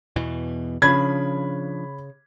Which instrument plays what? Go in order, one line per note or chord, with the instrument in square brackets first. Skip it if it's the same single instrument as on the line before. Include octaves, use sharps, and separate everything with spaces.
[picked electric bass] E2 B2 E3
[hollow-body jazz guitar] C#3 [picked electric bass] F3 D4 [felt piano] B5 G#6